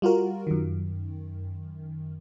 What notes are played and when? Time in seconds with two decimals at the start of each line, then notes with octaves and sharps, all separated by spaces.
0.02 G3 F4 F#4 A#4
0.47 F#2 D#3